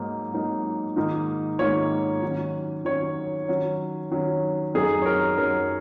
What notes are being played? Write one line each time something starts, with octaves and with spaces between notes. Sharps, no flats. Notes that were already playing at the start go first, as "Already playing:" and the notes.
Already playing: G#2 F#3 A#3 D#4
G#2 F#3 A#3 D#4
G#2 D#3 A#3 D#4
G#2 D#3 A#3 D#4 C#5
D#3 F#3 C#4
D#3 F#3 C#4 C#5
D#3 F#3 C#4
D#3 F#3 C#4
F#2 F#3 D#4 G#4
C#5
A#4
F#2 F#3 D#4 A#4